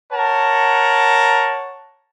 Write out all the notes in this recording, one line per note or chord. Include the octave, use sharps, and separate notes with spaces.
A#4 C#5 F#5 A5